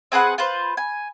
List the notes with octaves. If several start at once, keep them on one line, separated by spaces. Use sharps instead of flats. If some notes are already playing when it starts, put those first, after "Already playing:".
C4 G#4 B4 F#5
F4 B4 C5
G#5